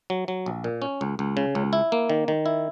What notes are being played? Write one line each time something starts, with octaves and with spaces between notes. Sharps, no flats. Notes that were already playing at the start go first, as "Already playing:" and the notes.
F#3
F#3
A#1
A#2
C#4
C#2
C#2
C#3
C#2
E4
A#3
D#3
D#3
E4